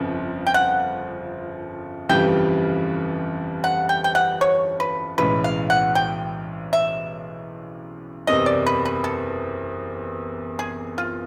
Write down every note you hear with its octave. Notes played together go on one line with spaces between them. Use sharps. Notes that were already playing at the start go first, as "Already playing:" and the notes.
Already playing: G1 F2 C#3 F3
G5
F#5
G1 F2 C#3 E3 G3 G5
F#5
G5
G5
F#5
C#5
B4
B1 A2 E3 G#3 C#4 B4
F5
F#5
G5
E5
F#1 E2 C3 D#5
D5
B4
B4
A4
G#4
F4